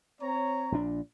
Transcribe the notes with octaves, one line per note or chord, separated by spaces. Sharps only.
C4 C#5 A#5
A#1 A#2 D4